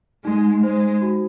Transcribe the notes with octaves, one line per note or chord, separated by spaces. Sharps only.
G#3 D#4
G#3 C5
F#4